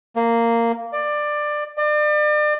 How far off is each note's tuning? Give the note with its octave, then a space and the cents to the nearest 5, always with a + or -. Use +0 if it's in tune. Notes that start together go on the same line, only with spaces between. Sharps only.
A#3 -10
D5 +15
D5 +35